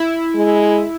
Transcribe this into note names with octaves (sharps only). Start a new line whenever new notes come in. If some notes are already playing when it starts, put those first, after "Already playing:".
Already playing: E4
G#3